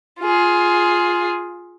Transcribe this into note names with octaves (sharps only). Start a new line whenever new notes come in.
F4 G#4